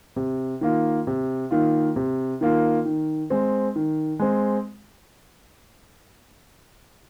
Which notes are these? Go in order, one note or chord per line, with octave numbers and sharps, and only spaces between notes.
C3
D#3 A#3 F4
C3
D#3 A#3 F4
C3
D#3 A#3 F4
D#3
G#3 C4
D#3
G#3 C4